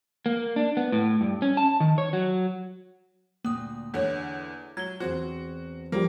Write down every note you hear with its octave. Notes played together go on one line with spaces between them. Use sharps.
A#3
D4
B3
A2
G2
C#4
A5
D#3
C#5
F#3
D2 A#2 A#3 D#6
E2 D3 E4 C#5
F#3 G#6 G7
E2 C4 F#4 C5
F3 G3 A#3 G4